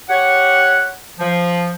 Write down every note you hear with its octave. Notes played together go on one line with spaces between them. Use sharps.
G4 C#5 F#5
F3